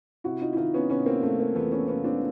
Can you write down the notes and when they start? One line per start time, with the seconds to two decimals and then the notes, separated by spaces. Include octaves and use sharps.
0.24 C3 E4 F#4
0.41 D#4 F4
0.53 E4
0.57 D#3 D#4 F4
0.74 B3 C#4
0.90 C3 B3 C#4
1.06 A#3 C4
1.23 C3 A3
1.39 A#3
1.55 E2 A3 B3
1.72 B3 C#4
1.88 C3 B3 C#4
2.04 C4 D4